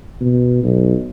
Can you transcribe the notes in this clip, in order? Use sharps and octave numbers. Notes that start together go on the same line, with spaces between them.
B2
B1